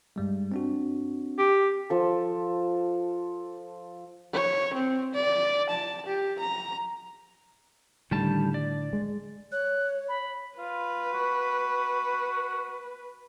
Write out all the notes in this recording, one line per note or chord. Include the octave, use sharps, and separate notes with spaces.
G2 G3 G#3
C4 D4 F#4
G4
F3 A4
C#5
C4
D5
A5
G4
A#5
A2 D3 D#3 G3 A5
D5
G#3
C#5 F#6
B5
F4 B4
F#4